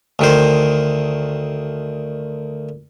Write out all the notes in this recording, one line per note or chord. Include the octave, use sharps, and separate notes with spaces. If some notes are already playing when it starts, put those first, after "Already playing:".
D2 D#3 C5